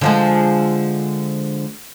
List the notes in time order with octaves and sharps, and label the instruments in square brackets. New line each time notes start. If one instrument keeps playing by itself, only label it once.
[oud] D3 F3 G#3